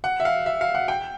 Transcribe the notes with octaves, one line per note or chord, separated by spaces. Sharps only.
F#5
E5
F5
E5
F5
F#5
G5